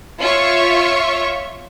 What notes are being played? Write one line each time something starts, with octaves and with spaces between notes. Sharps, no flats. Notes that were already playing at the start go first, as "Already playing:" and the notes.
F4 C#5 E5 C#6